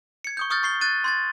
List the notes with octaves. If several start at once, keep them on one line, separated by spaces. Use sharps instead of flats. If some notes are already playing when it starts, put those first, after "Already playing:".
G#6 C#7
C#6 D#6 G6
C#6 D#6 F6 G6 A6
C#6 C7 G7
F#6 A6 D#7
C6 G#6 A6